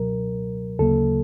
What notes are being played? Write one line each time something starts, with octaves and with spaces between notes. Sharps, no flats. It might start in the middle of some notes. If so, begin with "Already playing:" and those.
Already playing: C#2 B2 F#3 A#4
D2 C#3 F#3 A#3 A4